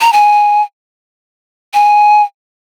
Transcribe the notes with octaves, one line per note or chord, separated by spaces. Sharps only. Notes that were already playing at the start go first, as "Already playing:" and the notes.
A#5
G#5
G#5